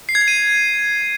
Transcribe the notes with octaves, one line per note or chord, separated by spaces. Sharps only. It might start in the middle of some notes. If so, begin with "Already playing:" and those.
C7
G#6
C7
D#7